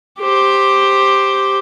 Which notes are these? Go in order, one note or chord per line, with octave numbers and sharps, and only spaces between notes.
G4 C5